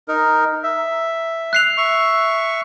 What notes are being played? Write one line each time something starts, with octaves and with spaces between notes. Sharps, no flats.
D#4 A#4
E5
F#6 C7 F7
E5 C#6